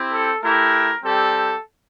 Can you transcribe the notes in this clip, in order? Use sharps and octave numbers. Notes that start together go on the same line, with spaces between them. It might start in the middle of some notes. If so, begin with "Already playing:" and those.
Already playing: C4 E4 G4
A4
A3 E4 G4 A#4
G3 C4 G4 A4